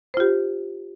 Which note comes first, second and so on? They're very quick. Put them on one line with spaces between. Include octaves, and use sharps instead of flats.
C5 F4 G4